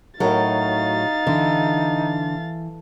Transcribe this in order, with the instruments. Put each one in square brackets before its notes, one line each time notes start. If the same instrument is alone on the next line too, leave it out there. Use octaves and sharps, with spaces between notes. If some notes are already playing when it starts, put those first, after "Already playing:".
[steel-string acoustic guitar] A2 F#3 [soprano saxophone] D#4 [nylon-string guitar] A4 A#4 [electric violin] F5 A6
[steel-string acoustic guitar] D3 [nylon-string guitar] E3